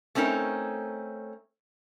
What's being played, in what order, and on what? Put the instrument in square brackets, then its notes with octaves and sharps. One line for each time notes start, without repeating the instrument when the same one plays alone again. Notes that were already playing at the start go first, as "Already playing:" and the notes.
[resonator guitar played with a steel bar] A3 C4 C#4 D#4 A#4